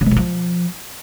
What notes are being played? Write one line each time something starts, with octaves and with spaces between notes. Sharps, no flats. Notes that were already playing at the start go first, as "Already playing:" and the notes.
C#3
B2
G2
F3